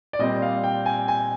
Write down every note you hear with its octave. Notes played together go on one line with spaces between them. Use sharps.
D5
A#2 G3 C4 D#5
F5
G5
G#5
G#5